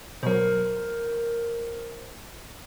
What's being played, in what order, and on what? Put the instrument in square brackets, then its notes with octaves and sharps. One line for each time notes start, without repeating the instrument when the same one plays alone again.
[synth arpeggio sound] B2 F#3 [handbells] A#4 C5